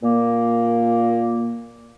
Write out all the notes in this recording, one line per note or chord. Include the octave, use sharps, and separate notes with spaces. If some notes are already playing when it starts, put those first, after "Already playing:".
A#2 A#3